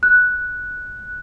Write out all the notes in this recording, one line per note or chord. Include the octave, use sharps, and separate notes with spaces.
F#6